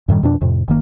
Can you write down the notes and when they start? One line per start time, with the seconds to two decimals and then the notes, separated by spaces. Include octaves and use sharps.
0.08 F#2 A2 D#3 G3
0.23 F2 B2 D4
0.41 F2 A2 C3
0.68 F#1 D#3 A#3